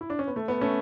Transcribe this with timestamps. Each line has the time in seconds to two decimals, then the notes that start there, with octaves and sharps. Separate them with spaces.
0.01 E4
0.10 D4
0.19 C#4
0.28 B3
0.36 A3
0.48 B3
0.61 A3 C#4